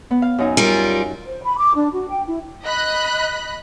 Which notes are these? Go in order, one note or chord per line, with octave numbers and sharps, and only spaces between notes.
B3
F5
F#2 D#4 G#5
G3 F4 A#4
C5
B5
D6
D4
F#4
G5
E4
D#5 B5 F#6